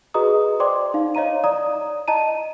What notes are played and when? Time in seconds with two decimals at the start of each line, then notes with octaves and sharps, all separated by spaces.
0.14 F#4 G#4 B4 D#5 A#5 D#6
0.60 C5 D5 G5 C6 D6
0.94 D#4 F5
1.15 C#5 D#5 F5 A#5 D#7
1.44 D5 A#5 D#6
2.08 D#5 A5 A#5 D#7